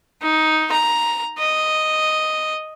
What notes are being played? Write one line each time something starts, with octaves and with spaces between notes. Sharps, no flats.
D#4
A#5
D#5